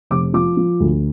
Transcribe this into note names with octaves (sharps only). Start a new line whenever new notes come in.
F1 D6
F3 D6
F3
D2